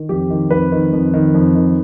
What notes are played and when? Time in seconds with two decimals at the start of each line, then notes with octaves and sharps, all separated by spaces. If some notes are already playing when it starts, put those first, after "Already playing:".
Already playing: D#3
0.09 F2 G4
0.30 D#3
0.50 F2 B4
0.72 D#3
0.93 F2
1.13 D#3
1.34 F2
1.55 D#3